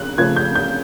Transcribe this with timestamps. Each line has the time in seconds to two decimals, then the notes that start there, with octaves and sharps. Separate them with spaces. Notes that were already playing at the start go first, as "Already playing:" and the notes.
Already playing: C#3 F#6
0.18 C#3 F3 A3 G#6
0.36 G6
0.55 G6